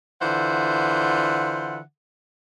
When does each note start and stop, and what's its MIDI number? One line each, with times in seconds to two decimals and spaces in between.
0.22 1.80 50
0.22 1.80 52
0.22 1.80 65
0.22 1.80 72
0.22 1.80 76
0.22 1.80 78